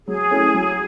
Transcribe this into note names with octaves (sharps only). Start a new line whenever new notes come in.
F#3 G#4
A3 C#4 E4
F#3